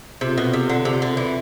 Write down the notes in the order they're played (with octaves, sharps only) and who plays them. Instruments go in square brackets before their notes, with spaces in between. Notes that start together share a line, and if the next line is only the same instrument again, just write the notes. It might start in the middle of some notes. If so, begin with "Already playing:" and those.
[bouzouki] C3 [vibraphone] C4 F4 A4
[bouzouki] B2
C3
D3
C3
D3
E3